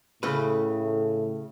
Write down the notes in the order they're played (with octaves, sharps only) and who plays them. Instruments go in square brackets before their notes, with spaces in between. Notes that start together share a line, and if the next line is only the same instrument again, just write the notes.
[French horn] A2 [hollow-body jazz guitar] C#3 A3 B4